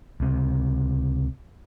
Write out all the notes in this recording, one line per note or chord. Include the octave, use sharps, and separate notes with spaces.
C#2 C3